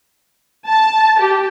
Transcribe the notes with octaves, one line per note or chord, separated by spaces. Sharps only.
A5
G4